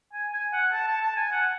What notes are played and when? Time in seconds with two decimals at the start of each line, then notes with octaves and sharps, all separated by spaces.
0.13 G#5
0.33 G#5
0.53 F#5
0.72 A5
0.87 A5
1.02 A5
1.16 G#5
1.32 F#5